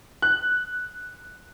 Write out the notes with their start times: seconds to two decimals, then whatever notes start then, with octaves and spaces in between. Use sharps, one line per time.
0.22 F#6